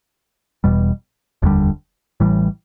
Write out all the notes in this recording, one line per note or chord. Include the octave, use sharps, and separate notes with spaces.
E1 E2 B2 G3
F1 D#2 D3 G3
A1 A2 E3 G3